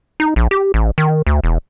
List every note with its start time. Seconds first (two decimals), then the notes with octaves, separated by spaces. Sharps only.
0.20 D#4
0.36 A#1
0.51 G4
0.74 A1
0.98 D#3
1.27 D2
1.44 E1